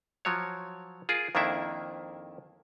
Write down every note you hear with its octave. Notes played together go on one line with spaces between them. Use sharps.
F3 F#3 C#5
F4 G#4 A#4
F2 D#3 A#3 D4 E4 E5